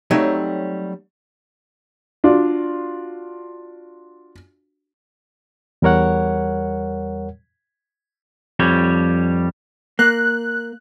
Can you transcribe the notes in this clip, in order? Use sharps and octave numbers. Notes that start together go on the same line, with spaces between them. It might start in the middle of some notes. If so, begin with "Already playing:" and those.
F#3 G3 A3 C4 D#4 C#5
D4 F4 F#4 D5
E2 G3 A#4 C#5 F#5
F2 G3 G4 C#5
A#3 F#6